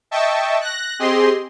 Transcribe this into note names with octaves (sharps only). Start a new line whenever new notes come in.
D#5 E5 G5 A5 C#6
F#6 A#6
C4 G4 G#4 D#5 C6